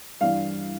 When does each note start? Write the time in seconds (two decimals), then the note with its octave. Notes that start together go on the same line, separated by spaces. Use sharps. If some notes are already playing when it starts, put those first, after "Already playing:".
0.21 G2 E3 F5